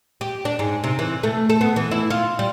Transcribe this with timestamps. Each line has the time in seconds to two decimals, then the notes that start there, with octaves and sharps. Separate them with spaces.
0.21 G4
0.45 D4
0.59 G#2
0.84 C3
0.99 E3
1.23 A3
1.50 A4
1.61 B3
1.76 E3
1.91 E4
2.10 F4
2.39 G3